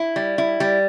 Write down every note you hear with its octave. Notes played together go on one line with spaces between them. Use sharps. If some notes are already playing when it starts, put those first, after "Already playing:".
Already playing: E4
G3
E4
G3